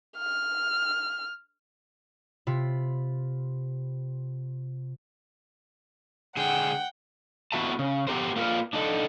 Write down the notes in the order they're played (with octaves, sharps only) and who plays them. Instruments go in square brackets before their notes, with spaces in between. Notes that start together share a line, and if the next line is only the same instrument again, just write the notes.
[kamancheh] F6
[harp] C3 F4 B5
[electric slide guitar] D3 G#3 G#4 [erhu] F#5 [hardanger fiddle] G5
[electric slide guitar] B3 E4 F#4 E5 A5
C#3
B3 G4 A#4 C5
A#3 F4 A#4 B4 D5
D4 D#4 A4